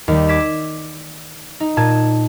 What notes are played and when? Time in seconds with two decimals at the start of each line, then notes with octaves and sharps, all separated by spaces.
0.08 D#2 G3
0.29 D6 G#6 B6 E7
1.60 D#4
1.77 A#2 A5 G#6 D#7